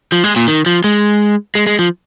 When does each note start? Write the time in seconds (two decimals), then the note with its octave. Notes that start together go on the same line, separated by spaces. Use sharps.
0.12 F3
0.24 G#3
0.36 A#2
0.48 D#3
0.66 F3
0.84 G#3
1.55 G#3
1.67 G#3
1.79 F3